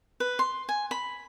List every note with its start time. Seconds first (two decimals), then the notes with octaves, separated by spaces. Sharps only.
0.20 B4
0.39 C6
0.69 G#5
0.91 B5